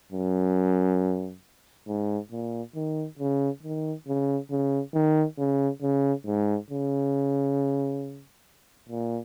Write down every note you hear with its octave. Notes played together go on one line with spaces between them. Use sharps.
F#2
G#2
A#2
D#3
C#3
D#3
C#3
C#3
D#3
C#3
C#3
G#2
C#3
A#2